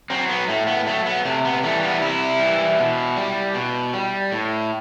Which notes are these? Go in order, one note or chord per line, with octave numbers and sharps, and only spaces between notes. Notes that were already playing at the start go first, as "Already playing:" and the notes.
F#3 C4
B3
A2 A3
B3
F#3 A3
B3
C3 A3
B3
E3 G3 A3
B3
C3 E4
E3 G3
B2
G3
B2
G3
A2